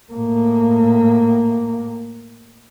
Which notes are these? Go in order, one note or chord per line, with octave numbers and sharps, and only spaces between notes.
A2 A#3